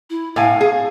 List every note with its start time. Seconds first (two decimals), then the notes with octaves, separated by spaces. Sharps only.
0.10 E4
0.36 A2 F5 G#5
0.61 G#4